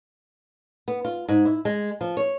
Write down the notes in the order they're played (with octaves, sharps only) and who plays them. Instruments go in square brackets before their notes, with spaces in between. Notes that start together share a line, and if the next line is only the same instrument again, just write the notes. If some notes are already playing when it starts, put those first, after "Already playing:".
[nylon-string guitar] B3
F4
G#2
E4
G#3
F3
C#5